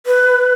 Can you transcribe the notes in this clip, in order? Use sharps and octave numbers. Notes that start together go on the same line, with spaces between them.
B4